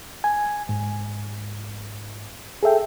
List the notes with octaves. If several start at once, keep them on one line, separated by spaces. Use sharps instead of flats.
G#5
G#2
G#4 A4 E5 G5